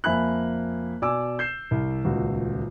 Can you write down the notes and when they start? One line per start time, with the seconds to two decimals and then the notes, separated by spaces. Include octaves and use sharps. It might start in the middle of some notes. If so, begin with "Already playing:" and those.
0.04 F2 A#3 E5 G#5 B5 F#6
1.02 B2 D5 G#5 D6 E6
1.39 G6 C7 E7
1.71 C2
2.04 D#1 C#2 F#4